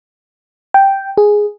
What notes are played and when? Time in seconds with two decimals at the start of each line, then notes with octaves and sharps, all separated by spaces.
0.74 G5
1.18 G#4